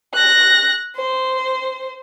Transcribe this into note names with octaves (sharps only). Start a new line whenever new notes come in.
F#6 A#6
C5